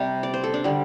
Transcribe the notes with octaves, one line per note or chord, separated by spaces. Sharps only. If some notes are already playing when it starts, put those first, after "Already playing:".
Already playing: C3 G3
D5
C5
A4
D4
D3 G3